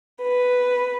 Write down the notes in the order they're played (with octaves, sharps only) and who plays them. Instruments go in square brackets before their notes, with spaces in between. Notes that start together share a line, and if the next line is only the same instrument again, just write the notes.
[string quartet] B4